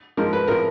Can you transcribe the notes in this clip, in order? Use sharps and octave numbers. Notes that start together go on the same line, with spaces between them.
G#2 F3 G#3 A#4
B4
A2 F3 A#4